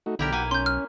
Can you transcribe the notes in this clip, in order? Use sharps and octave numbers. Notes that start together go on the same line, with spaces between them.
A3 D#4 F#4
B1 D3 E4 G4 A#4
A#3 F#5 G#5
C#4 C6 G6
F6